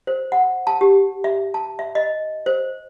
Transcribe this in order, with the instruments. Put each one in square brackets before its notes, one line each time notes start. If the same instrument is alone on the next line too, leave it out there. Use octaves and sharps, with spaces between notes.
[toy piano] C5
F#5
A5
G4
E5
A5
E5
D#5
C5